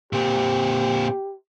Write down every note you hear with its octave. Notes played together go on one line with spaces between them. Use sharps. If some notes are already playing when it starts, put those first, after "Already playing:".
A#2 C4 G4